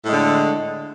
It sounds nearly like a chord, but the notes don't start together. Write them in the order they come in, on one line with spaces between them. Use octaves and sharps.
A2 G#3 D3